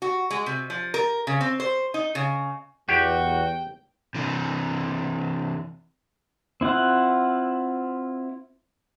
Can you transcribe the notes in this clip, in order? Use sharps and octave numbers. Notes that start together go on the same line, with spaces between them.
F#4
G#3
C3
F3
A#4
C#3
C4
C5
D#4
C#3
E2 F#4 G4 G5
C3 E3
C4 E4 F4 F#5